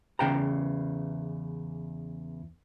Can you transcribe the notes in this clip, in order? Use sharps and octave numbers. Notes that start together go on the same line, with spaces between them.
E2 C#3 G5 A#5